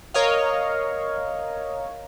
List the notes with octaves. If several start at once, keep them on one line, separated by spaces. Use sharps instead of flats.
A#4 C#5 D#5 F5